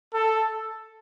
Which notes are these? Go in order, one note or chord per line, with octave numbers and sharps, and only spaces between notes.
A4